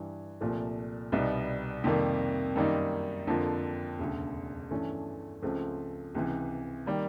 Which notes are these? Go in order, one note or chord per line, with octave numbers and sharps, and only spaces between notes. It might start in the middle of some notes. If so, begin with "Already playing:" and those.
Already playing: G2 E3 G3
C2 A#2 F3 A3
C2 B2 G3 B3 D#4
F2 C3 D#3 G3 A#3
F#2 D#3 G3 A#3 D#4
F2 D3 F3 A#3
E1 D2 C#3
G2 E3 A3 C#4
C#2 C#3 F3 A3 C4
C#2 C3 E3
D#3 G3 A#3